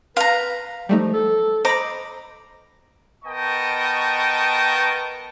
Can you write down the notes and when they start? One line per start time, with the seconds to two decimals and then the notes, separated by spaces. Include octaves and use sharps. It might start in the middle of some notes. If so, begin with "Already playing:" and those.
0.17 B4 F5 A#5 C6
0.89 F3 G3 A3 D#4
1.13 A4
1.65 C5 D#5 A#5 B5 D6
3.25 B3 A#4 D#5 G5 A5 C#6